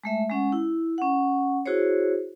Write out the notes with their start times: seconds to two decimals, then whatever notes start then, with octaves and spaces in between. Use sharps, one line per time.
0.04 G#3 A3 E5
0.29 G#3 C#4 F#5
0.52 E4
0.98 C#4 F#5
1.66 E4 F#4 G#4 C5 C#5